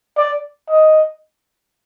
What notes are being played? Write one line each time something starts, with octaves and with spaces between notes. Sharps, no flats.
D5
D#5